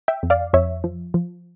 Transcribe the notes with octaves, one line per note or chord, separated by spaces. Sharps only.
E5 G5
F2
D5 F5
F2 C#5 E5
F3
F3